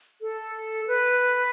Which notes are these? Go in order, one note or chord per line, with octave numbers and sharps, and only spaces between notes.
A4
B4